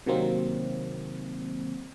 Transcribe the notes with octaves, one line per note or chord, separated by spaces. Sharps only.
C3 D#3 F#3 A#3 C4